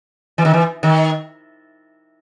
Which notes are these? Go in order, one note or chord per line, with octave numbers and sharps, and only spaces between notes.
E3
D#3
E3
D#3